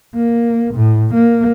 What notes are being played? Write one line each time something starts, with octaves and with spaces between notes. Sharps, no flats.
A#3
A2
A#3